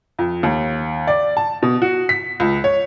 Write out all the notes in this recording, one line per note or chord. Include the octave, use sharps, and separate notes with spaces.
F2
D#2
D5
A5
B2
F#4
B6
C#2
C#5